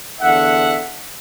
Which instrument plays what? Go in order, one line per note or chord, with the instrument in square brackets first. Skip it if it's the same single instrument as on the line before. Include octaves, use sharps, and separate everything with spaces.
[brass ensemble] E2 D3 E5 F#5